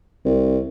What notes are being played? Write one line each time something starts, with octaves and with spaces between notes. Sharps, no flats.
C2